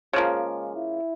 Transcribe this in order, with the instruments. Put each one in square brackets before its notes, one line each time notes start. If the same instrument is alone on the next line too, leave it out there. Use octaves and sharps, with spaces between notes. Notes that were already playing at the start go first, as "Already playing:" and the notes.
[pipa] C#3 F3 A#3 [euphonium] G#3
[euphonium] G#3
E4